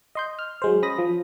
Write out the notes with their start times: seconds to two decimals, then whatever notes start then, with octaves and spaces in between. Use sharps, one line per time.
0.15 D#5 C6 G6
0.39 F6
0.62 F#3 G#3 C5
0.82 C#4 B5 D#6 A#6
0.98 F3